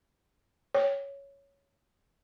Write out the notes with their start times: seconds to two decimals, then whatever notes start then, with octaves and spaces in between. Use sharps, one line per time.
0.74 C#5